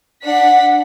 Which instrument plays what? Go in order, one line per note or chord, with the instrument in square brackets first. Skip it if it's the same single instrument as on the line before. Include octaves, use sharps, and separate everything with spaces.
[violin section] D4 F#5 B6